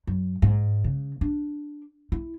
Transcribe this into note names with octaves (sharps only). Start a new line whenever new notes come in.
F#2
G#2
C#3
D4
E4